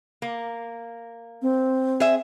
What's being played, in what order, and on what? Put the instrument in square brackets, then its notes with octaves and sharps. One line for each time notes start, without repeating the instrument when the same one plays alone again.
[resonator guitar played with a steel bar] A#3
[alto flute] C4
[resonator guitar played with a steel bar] G#4 E5